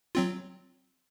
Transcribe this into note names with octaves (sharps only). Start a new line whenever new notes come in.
F#3 C4 F4